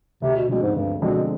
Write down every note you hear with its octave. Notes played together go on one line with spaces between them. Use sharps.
D2 C3
B2
B2 D3 F3 G#3 C4
G#2
D2 G2
B2 D3 F3 G#3 C4